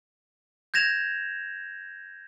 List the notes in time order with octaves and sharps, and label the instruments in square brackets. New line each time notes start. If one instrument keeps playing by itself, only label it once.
[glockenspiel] G6 G#6 A#6 E7 F7